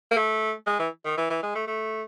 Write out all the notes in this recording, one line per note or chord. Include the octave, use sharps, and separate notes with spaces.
A#3
A3
G#3
E3
D#3
E3
E3
G#3
A3
A3